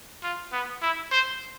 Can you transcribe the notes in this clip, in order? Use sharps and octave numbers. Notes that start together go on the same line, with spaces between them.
F4
B3
E4
C5